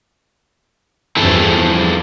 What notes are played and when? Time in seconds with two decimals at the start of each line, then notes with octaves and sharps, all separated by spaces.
1.16 E2 G2 F3 C4 E4 G#4 A4